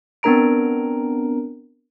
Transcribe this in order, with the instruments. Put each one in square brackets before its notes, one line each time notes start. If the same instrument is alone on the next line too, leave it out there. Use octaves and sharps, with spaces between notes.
[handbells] B3 C4 D4 A#4 A#5 D7